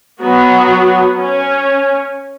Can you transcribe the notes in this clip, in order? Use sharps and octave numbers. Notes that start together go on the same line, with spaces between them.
F#3 B3 F#4
C#4